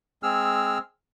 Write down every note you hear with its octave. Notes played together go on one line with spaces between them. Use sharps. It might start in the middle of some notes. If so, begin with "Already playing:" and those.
G#3 C4 G#4 E6 F6